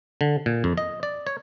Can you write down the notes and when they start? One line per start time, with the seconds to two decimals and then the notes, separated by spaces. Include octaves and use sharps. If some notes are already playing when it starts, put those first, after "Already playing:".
0.21 D3
0.46 A#2
0.64 F2
0.77 D#5
1.03 D5
1.27 C#5